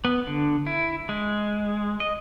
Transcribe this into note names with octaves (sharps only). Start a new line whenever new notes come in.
B3
D3
E4
G#3
D#5